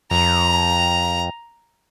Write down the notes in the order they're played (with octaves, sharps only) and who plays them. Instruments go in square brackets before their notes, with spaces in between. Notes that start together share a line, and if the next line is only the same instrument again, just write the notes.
[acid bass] F2 [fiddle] A#5